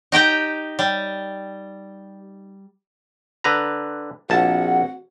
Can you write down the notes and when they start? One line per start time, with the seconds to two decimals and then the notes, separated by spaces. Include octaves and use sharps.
0.12 D#4 G4 G5 A#5
0.79 G3
3.44 D3 B4 A#5
4.30 A#1 C4 F#4 F#5 A5